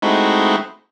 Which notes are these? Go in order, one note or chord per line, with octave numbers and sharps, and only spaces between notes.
G#3 A3 C4 D#4 E4 F#4